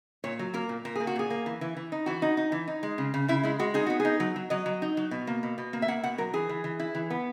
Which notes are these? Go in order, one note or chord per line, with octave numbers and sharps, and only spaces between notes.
A#2 C#5
F#3
A#3 A#4
A#2
A#2 A#4
A#3 G#4
F#4
A#2 G#4
A#3
E3
E3
E3
D#4
E3 F#4
D#4
D#4
E3
D#4
G#3
C#3
C#3
C#3 E4
G#3 E4
G#3 F#4
D#4 G#4
B3 F#4
G#4
D#4
F#3
F#3
F#3 D#5
F#3
D#4
F#3
B2
A#3
B2
B2
A#3
E5
A#3 F#5
B2 F#5
F#3 A#4
E3 G#4
E3
E3
E4
E3
B3